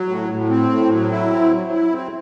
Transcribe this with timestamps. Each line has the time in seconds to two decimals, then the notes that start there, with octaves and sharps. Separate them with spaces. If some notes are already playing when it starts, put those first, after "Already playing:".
Already playing: F#3
0.08 A2
0.30 A2
0.49 C4
0.70 A2
0.91 F#3
1.11 E4
1.30 C4
1.51 F#3
1.71 E4
1.92 C4